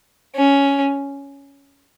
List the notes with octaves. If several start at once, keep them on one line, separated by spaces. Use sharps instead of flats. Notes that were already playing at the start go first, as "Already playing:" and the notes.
C#4